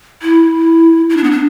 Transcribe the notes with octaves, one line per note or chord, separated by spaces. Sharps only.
E4
E4
D4
B3
D4